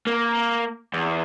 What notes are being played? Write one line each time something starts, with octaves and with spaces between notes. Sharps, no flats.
A#3
E2